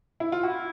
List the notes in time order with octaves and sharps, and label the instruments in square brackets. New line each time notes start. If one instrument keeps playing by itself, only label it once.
[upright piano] E4
F4
[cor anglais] E4 [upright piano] F#4